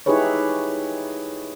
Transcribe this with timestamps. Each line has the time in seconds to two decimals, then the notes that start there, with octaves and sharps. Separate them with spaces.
0.06 D#4 E4 G4 G#4 B4 C#5